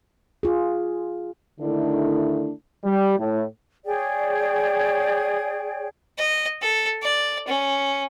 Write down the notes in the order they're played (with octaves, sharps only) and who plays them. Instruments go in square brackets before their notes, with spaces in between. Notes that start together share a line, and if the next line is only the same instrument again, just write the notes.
[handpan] F4 G#4
[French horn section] D3 D#3 A3 D4 E4
[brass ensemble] G3
A2
[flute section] G#4 C#5 D5 G5
[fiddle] D#5
A4
D5
C#4